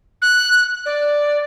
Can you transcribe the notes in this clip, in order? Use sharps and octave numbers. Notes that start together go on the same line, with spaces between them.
F#6
D5